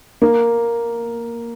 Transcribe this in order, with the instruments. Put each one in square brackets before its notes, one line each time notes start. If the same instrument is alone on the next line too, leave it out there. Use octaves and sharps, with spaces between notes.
[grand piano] A#3